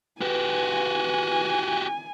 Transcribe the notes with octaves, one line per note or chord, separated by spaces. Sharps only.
F#4 G4 B4 G#5